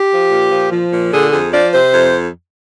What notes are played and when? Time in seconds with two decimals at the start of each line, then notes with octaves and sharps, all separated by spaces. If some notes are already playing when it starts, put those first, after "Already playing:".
Already playing: G4
0.12 F3
0.31 A#2
0.51 F3
0.72 F3
0.93 A#2
1.12 D3 G#4
1.33 F2 G#4
1.53 F3 D5
1.73 C3 C5
1.93 F2